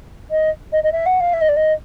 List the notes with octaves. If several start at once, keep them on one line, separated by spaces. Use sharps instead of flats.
D#5
D#5
D#5
E5
F#5
F5
E5
D#5
D5
D#5